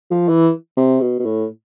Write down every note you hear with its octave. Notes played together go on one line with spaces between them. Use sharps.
F3
E3
C3
B2
B2
A2